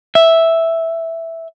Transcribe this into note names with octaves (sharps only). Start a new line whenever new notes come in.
E5